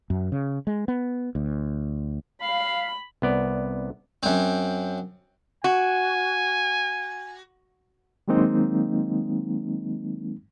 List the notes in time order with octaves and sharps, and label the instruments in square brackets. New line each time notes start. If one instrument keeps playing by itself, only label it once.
[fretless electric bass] F#2
C#3
G#3
B3
D2
[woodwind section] F5 [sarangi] B5
[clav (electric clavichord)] C2 B3 D5
[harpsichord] F#2 C4
[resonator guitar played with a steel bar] F#4 [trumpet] G#5
[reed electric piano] D#3 F#3 G#3 A#3 C4 D#4